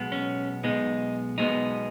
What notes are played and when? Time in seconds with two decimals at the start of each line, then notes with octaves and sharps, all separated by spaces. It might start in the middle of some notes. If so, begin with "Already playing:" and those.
Already playing: B1 B2 G#3 B3
0.12 C#4
0.63 B1 B2 G#3 B3 D#4
1.37 B1 B2 G#3 B3 D#4